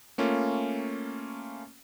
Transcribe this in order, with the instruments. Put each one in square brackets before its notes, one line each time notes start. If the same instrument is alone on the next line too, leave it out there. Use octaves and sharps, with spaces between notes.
[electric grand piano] A3 A#3 C#4 F4